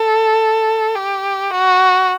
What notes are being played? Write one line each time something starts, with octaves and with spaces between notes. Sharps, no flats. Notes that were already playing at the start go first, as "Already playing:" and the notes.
Already playing: A4
G4
F#4